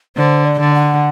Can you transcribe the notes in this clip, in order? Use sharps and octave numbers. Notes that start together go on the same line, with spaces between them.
D3 C5
D5
D3
F#5